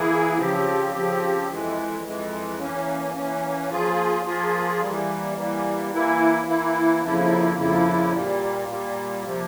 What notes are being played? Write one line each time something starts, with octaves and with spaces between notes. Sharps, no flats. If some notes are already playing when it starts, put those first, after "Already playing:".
Already playing: E3 A#3 E4 G#4
C#3 F3 C4 G4
C#3 F3 C4 G4
F2 E3 G#3
F2 E3 G#3
E3 A#3 C#4
E3 A#3 C#4
F3 A#3 F4 G#4
F3 A#3 F4 G#4
E3 G3 A#3
E3 G3 A#3
E3 A#3 E4
E3 A#3 E4
F2 C#3 F3 A#3 E4
F2 C#3 F3 A#3 E4
A#2 G3 A#3
A#2 G3 A#3
C3 F3 A#3